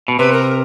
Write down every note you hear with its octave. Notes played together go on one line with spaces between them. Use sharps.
B2
C3 B4
A#4
A#4